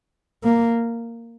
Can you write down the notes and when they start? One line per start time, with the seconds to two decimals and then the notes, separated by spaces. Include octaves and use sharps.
0.43 A#3